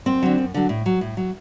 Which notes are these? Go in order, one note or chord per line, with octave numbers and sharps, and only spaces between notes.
F#2 C4
D3 F#3
F#2
D3 F#3
A2
F#3
A2
F#3